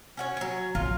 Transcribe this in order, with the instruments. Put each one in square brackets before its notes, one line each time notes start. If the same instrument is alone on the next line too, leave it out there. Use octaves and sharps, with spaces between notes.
[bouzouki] C#4 F#4 C#5
F#3 C#5
[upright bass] A#1 [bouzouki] F4